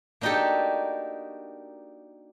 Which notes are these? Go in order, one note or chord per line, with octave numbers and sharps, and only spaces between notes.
A#3 D4 D#4 F#4 G4 A4